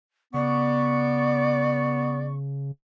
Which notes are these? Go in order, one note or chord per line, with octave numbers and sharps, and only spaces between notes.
C#3 B3 D5 C#6